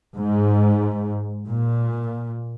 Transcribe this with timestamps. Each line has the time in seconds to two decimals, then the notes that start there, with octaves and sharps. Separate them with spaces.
0.17 G#2
1.47 A#2